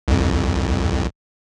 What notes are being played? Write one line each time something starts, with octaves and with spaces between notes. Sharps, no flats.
C2 F2